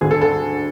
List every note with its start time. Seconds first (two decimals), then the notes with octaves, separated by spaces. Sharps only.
0.01 D2 D3 G#4
0.11 A4
0.21 A4